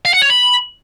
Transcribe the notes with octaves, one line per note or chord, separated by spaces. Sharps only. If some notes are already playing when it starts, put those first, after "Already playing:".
F5
F#5
C#5
B5